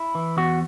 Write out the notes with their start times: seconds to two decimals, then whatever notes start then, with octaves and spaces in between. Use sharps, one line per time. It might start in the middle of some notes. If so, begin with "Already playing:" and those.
Already playing: E4
0.15 E3
0.37 E2 F#4